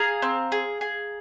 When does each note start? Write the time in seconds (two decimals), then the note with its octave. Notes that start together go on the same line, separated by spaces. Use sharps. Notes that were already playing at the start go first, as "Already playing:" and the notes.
Already playing: G#4 F5 A#5
0.22 C4
0.52 G#4
0.81 G#4